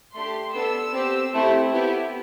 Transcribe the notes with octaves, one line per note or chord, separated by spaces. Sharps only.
A3 D4 G4 C6
B3 D4 A4 E6
C4 G4
A3 C4 E4 G4
B3 E4 G4